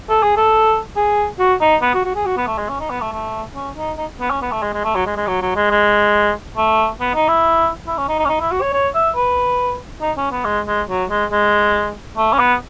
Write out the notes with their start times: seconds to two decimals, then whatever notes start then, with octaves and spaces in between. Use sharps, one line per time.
0.09 A4
0.23 G#4
0.37 A4
0.96 G#4
1.39 F#4
1.61 D#4
1.82 B3
1.94 F#4
2.04 F#4
2.15 G#4
2.26 F#4
2.37 B3
2.47 A3
2.58 G#3
2.69 C#4
2.80 D#4
2.90 B3
3.01 A3
3.12 A3
3.55 C#4
3.77 D#4
3.98 D#4
4.20 B3
4.31 C#4
4.42 B3
4.52 A3
4.62 G#3
4.74 G#3
4.84 A3
4.95 F#3
5.06 G#3
5.17 G#3
5.27 F#3
5.42 F#3
5.56 G#3
5.71 G#3
6.57 A3
7.00 B3
7.15 D#4
7.28 E4
7.87 E4
7.97 C#4
8.09 D#4
8.19 D#4
8.25 C#4
8.29 D#4
8.40 E4
8.51 F#4
8.61 C#5
8.73 C#5
8.95 E5
9.16 B4
10.02 D#4
10.17 C#4
10.31 B3
10.45 G#3
10.67 G#3
10.89 F#3
11.10 G#3
11.32 G#3
12.17 A3
12.33 C#4
12.39 B3